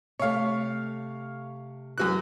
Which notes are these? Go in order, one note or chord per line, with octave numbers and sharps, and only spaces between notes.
C3 A3 C#5 F5
F#2 E3 C4 F#4 F#6